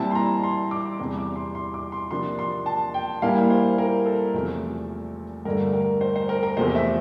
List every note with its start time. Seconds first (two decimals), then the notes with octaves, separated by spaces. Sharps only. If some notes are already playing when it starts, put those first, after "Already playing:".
Already playing: A#2 G3 C4 E4 A5
0.11 C6
0.15 A#5
0.43 C6
0.71 D6
0.99 E2 C3 G3 C4 E4
1.18 D6
1.36 C6
1.55 C6
1.74 D6
1.92 C6
2.11 C3 F3 A#3 D4 C6
2.39 C6
2.66 A5
2.94 G5
3.22 A#2 G3 A#3 E4 F5
3.50 C5
3.78 A#4
4.06 A4
4.34 E2 C3 F3 A3 C4
5.45 G2 D3 A3 A#4
5.73 A#4
6.01 C5
6.16 C5
6.29 A#4
6.43 A#4
6.57 E2 C3 F3 A3 C5
6.75 E5